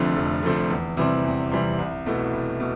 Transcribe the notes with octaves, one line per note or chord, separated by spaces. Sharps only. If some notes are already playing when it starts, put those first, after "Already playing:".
Already playing: F1 F2 D3 A3 C4
F1
F2 D3 A3 C4
E2
C3 E3 G3 C4
E2
C3 E3 G3 C4
C2
B2 A3 E4
C2
B2